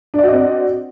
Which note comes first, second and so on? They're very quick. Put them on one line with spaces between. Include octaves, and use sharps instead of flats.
D4 D5 F#4 D#5 C4